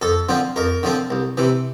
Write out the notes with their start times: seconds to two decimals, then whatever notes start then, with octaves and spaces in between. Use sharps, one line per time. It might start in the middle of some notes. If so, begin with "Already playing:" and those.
0.02 F2 A4
0.29 D3 F3 C4
0.56 F2 A#4
0.83 D3 F3 C4
1.10 C2
1.37 C3 E3